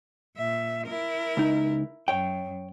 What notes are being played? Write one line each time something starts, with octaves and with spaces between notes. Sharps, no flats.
A#2 E5
E4 A#4
C#2 D#4
F#2 C#5 G5